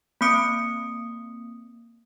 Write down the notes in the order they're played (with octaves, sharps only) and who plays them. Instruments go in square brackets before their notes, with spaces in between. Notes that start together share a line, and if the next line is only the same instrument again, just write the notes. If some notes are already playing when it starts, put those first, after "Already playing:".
[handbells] A#3 C4 D#6 C#7 D7